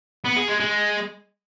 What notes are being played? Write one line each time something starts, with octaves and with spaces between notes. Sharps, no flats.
B3
G#4
G#3
G#3